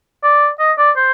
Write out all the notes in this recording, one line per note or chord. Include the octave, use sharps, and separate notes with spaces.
D5
D#5
D5
C5